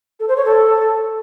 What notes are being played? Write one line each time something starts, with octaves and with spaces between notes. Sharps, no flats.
A4
C5
C#5
A4